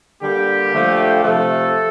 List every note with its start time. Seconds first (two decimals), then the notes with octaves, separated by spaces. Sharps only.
0.21 D3 G3 A#3 G4
0.73 D3 F3 A3
1.23 C3 F3 A3 A4